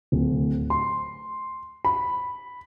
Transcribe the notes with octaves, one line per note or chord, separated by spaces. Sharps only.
D1
C6
B5